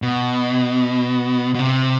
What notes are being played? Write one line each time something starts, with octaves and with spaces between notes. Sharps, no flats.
B2
B2
C3